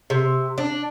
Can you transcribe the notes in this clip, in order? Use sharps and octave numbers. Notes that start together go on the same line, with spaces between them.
C3
D4